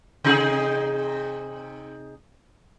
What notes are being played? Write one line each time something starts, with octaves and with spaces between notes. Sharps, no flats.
C3 D#4 G#4